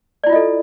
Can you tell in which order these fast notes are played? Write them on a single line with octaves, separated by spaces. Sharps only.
D5 E4 F4 D#5 A4